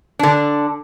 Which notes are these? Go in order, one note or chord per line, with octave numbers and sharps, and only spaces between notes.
D3 D4